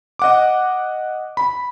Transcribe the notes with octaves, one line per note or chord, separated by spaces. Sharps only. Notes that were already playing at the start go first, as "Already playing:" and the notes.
D#5 F#5 D6
B5